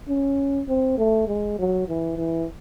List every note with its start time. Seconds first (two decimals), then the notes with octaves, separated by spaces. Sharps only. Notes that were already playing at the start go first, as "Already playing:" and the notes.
0.08 C#4
0.68 C4
0.97 A3
1.27 G#3
1.58 F#3
1.88 E3
2.17 E3